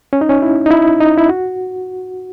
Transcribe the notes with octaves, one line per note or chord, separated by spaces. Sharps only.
C#4
D#4
C#4
E4
D#4
E4
D#4
E4
F#4